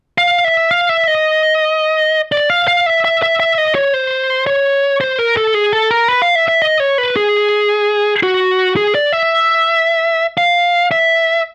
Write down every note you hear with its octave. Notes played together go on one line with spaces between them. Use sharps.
F5
E5
F5
E5
D#5
D5
F5
F5
E5
E5
E5
E5
D#5
C#5
C5
C#5
C5
A#4
A4
G#4
A4
A#4
B4
F5
E5
E5
D#5
C#5
B4
G#4
F#4
G#4
D5
E5
F5
E5